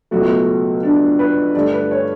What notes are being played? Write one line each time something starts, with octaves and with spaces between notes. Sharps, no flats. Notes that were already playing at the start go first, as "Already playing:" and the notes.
C#2 B2 F#3 A3 F#4
D4
B4
G2 D3 A3 D5
B4
C#5